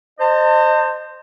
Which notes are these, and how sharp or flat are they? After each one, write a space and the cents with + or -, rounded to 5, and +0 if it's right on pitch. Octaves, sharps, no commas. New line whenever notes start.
C5 +0 D#5 -25 A5 +35